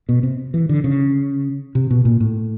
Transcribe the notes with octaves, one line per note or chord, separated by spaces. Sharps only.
B2
C3
E3
D3
C#3
C3
B2
A#2
A2